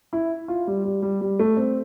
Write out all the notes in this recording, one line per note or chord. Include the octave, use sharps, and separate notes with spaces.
E4
F4
G3
G3
G3
G3
A3
C4